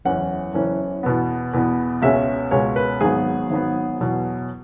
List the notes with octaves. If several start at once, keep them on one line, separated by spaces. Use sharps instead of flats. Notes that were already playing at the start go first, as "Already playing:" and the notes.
F#1 E2 E3 C#4 F#5
F#1 E2 E3 C#4
E2 B2 B3
E2 B2 B3
C#2 B2 G#3 C#4 E5
C#2 B2 G#3 C#4 C#5
B4
G#1 G#2 F#3 B3 G#4
G#1 G#2 F#3 B3
E2 B2 F#3